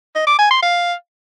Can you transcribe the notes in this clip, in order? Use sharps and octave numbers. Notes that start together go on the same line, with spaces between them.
D#5
D6
G#5
C6
F5